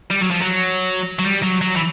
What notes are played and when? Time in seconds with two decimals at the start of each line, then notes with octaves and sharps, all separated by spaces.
0.11 G3
0.22 F#3
0.31 F3
0.42 F#3
1.19 F#3
1.24 G3
1.43 F#3
1.61 F#3
1.76 E3